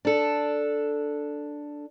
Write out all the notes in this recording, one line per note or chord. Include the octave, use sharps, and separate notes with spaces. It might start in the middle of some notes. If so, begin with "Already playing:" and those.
D4 A4